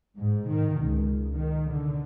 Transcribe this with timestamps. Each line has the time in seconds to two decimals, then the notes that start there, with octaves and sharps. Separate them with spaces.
0.16 G#2
0.48 D#3
0.80 C#2
1.36 D#3
1.71 D3